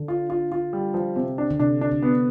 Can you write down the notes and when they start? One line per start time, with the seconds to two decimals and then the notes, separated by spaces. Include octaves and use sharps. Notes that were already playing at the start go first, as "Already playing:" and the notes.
Already playing: D3
0.08 F4
0.30 F4
0.52 F4
0.73 G3
0.94 F3
1.16 C3
1.38 D4
1.50 D3
1.59 C3 D4
1.81 D4
1.91 D3
2.02 B3